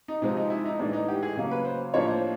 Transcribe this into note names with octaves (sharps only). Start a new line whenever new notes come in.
D#4
C3 F3 G#3 C4 D#4
D#4
E4
D#4
A2 E3 G#3 D4
D#4
G4
G#4
C#3 F#3 A#3 C#4
B4
C5
A2 F3 A#3 D4 C#5
C5